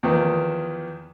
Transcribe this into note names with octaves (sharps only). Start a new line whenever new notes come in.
E2 D#3 F3 B3